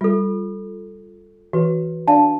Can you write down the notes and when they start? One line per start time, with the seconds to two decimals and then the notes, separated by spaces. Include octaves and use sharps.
0.01 G3 F4 A4
1.53 E3 F#4 B4
2.08 D4 D5 F5 A5